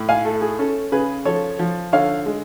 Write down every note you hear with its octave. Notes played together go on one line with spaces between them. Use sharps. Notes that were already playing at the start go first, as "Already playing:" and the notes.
Already playing: A2
F5 G#5
A3 A4
G#4
C#4 A4
C#3 G#4 B4
F3 A4 C#5
F3
D3 C#5 F5
G#3